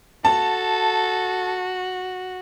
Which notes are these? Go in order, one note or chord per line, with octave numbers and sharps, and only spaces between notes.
F#4 A4 A5